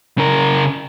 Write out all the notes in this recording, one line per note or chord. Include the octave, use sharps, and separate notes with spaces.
C#3 A#4